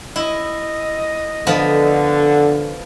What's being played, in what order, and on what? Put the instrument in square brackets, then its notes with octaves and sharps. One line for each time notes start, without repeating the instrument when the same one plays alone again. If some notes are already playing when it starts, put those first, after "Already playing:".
[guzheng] E4 [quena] D#5
[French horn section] D3 [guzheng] F3 B3